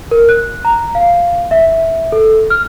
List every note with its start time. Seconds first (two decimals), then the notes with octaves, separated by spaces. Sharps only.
0.11 A#4
0.29 F#6
0.65 A#5
0.95 F5
1.51 E5
2.12 A4
2.50 F6